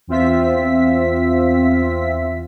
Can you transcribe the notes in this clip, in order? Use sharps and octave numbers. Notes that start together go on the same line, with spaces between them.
E2 C4 F4 E5 B6